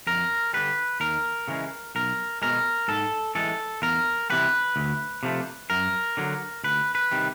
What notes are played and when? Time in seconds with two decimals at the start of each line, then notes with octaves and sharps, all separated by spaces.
0.07 F2 A#4
0.53 D3 G3 B4
1.00 D#2 A#4
1.48 C#3 E3 G#3
1.95 B1 A#4
2.42 B2 G#3 A#4
2.88 G#2 A4
3.35 E3 G#3 A4
3.82 E2 A#4
4.30 C3 E3 G3 B4
4.76 D2
5.23 C3 F3 A3
5.70 F#2 A#4
6.17 D3 F#3
6.64 D2 B4
6.95 B4
7.11 C3 D#3 G3